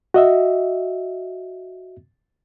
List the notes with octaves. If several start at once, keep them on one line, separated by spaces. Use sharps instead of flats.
F#4 D#5 E5